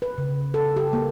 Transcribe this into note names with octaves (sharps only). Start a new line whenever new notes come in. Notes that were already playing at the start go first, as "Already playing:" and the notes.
B4
C#3
A4
G4
A#3